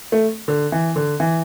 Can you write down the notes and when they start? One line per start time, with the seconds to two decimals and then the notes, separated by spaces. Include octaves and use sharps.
0.12 A3
0.48 D3
0.72 E3
0.96 D3
1.20 E3